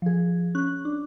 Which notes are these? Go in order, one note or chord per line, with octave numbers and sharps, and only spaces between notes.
F3 G#4
C#4 F#6
D4